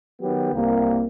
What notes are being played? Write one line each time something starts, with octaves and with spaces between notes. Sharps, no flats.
D#3 F#3 B3 G4
C2 A#3